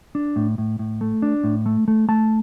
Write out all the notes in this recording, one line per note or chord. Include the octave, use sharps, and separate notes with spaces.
D4
A2
A2
A2
A3
D4
A2
A3
A3
A3 A5